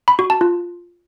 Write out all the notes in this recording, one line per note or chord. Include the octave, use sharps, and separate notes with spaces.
B5
F#4
A5
F4